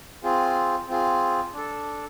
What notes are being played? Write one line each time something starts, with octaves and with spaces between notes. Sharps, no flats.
C4 F4 G#4
C4 F4 G#4
D4 A4